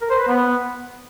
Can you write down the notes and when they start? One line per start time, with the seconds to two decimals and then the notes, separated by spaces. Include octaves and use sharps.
0.01 A#4
0.10 C5
0.19 B4
0.28 B3